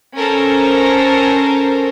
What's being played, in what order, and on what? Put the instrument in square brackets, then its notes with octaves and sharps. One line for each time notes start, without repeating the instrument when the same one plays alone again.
[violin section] C#4 A4 A#4 C5